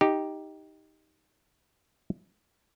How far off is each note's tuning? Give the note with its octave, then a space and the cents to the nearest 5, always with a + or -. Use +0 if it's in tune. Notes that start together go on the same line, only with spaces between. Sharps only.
D#4 +10 G4 +0